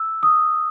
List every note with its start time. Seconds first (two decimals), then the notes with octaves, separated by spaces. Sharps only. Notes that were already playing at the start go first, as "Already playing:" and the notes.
Already playing: E6
0.23 D#6